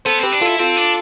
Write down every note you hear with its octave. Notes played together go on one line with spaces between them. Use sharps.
B3 A4 C5
C4 G4 B4
D4
E4 F4 A4
C4 F4 A4
D4